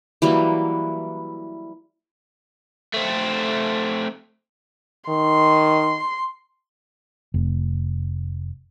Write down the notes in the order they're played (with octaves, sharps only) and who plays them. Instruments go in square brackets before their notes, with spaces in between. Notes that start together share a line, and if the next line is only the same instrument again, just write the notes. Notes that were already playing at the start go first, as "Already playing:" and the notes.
[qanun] E3 F#3 G3 A#3
[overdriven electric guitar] A3 C4
[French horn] D#3 [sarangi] C6
[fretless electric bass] F1